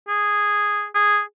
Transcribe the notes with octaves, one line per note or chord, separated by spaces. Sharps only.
G#4
G#4